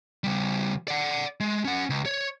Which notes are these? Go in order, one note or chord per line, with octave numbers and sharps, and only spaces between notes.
C#3 G3
D5 F#5
G#3
C#4 F#5
C#2
C#5